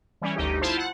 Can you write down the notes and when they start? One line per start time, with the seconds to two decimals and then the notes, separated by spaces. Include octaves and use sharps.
0.22 E3 G3 C#4
0.36 G1 D2 D#4 G4
0.61 E4 F4 C5 A5
0.77 F#5